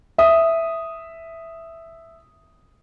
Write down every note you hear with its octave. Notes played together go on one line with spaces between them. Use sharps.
E5 D#6